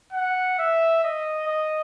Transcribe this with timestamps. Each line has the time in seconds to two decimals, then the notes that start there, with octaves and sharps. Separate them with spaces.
0.13 F#5
0.59 E5
1.04 D#5
1.48 D#5